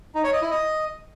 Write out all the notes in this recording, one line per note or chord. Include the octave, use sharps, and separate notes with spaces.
D#4
C#5
D#5
E4
D#5